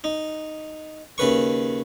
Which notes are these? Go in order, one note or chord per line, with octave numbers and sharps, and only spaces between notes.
D#4
D#2 C#3 B4 C#6